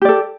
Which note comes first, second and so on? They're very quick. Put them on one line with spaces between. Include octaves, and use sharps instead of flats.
G4 D5 A4